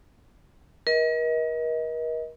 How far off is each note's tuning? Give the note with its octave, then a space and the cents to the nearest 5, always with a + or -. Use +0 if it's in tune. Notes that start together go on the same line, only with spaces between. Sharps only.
A#4 +40 D#5 +30